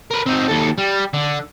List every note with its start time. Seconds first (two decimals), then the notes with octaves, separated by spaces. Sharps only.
0.11 A#4 B4
0.27 C4 D#4
0.49 D#2 A4
0.78 G3
1.13 D3